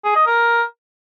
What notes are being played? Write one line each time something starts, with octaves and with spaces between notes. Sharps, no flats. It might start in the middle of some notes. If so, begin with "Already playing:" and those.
G#4
D#5
A#4